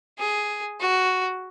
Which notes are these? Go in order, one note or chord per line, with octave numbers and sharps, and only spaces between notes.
G#4
F#4